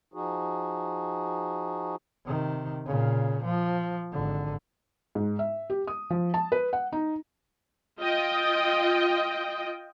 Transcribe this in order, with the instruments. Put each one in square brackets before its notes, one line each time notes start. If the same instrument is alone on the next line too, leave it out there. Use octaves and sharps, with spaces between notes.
[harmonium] F3 D#4 F#4 G#4
[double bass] C3 D#3
A#2 C#3
F3
G#1 D3
[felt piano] G#2
E5
G4
D#6
F3
A5
B4
F#5
D#4
[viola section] F4 D#5 G5